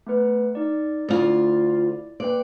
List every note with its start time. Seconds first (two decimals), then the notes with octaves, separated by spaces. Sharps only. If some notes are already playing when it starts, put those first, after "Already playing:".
0.07 A3 B3 B4
0.55 D#4 D5
1.09 D2 E4 F4 D5 A6
2.20 A#3 B4 D5 G5